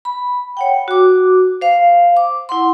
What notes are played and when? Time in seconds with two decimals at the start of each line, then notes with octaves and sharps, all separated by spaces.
0.05 B5
0.57 C#5 F#5 G5
0.88 F#4 D6
1.61 C5 F5
2.17 D6
2.49 E4 F#5 C6